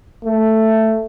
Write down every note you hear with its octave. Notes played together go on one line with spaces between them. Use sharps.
A3